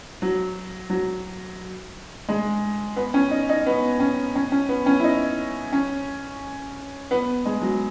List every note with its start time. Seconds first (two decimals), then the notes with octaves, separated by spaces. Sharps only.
0.22 F#3
0.90 F#3
2.29 G#3
2.96 B3
3.14 C#4
3.31 D#4
3.49 D#4
3.66 B3
4.00 C#4
4.35 C#4
4.52 C#4
4.69 B3
4.86 C#4
5.00 E4
5.04 D#4
5.72 C#4
7.11 B3
7.45 G#3
7.62 F#3